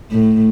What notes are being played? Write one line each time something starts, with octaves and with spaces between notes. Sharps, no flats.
A2